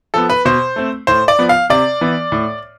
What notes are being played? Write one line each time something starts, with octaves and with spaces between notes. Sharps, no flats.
F3 B3 A4
B4
B2 C5
A3 C4
A2 C5
D5
F3 B3
F5
C3 D5
E3 B3
A2